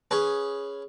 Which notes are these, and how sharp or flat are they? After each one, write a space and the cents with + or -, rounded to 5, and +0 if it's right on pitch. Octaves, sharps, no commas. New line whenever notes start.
C#4 +0 G#4 +0 B4 +0